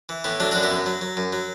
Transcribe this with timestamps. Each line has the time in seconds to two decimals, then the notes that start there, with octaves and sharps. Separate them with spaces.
0.09 E3
0.24 A2 B3
0.40 F#3 A3 D4
0.51 F#2 D4 F#4
0.63 B3 E4
0.71 F#2
0.86 F#3
1.01 F#3
1.17 F#2
1.33 F#3